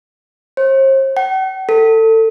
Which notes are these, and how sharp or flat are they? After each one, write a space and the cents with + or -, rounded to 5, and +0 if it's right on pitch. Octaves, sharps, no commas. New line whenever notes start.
C5 +40
F#5 +45
A4 +25